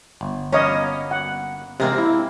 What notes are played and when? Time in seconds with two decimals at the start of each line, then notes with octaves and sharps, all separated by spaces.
0.21 G1
0.52 A#3 B3 C#4 C#5 D#5
1.11 F#5
1.80 C3 G#3 A#3 C4
1.98 E4